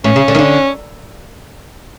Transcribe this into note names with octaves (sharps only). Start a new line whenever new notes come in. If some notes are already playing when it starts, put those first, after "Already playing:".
A2 C#4
C#3
D3
D#3
D3